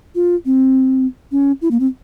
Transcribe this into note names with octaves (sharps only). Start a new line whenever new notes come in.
F4
C4
C#4
E4
A#3
C4